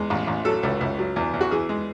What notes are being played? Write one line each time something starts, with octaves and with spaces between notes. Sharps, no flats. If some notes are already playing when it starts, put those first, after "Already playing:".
Already playing: E2 G#3
A1
A1
F#3 A4
C#2
C#2
F#3
E2
E2
F#4
E3 G#4
G#3